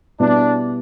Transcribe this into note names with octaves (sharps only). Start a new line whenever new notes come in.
B2 G3 B3 D4 E4